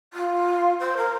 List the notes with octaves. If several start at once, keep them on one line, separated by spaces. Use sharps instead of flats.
F4
C5
A#4